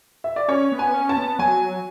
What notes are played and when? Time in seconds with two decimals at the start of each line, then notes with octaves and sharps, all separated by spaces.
0.24 E5
0.36 D5
0.48 C#4 C#5
0.72 B3
0.79 G#5
0.94 C#4
1.09 A5
1.17 B3
1.39 F#3 G#5